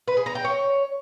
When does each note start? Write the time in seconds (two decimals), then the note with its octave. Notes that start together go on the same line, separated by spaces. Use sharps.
0.08 B4
0.17 G#4
0.26 A#5
0.35 G5
0.45 C#5